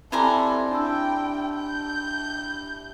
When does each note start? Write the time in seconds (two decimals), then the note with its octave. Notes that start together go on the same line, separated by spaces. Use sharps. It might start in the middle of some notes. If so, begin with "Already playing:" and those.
0.12 G3 C4 E4 A4 C5 G#5 A#5 D6
0.71 D4 G5 A5 E6
1.56 G6